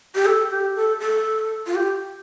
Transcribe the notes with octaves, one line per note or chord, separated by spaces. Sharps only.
G4
A4
G4
A4
A4
F4
G4